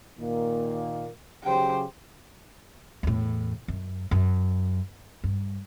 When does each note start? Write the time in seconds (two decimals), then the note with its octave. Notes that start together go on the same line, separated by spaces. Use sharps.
0.18 A#2 D#3 A#3
1.44 C#3 F#3 G4 C5 G5
3.03 E2 A2
3.68 F#2
4.11 F#2
5.24 G2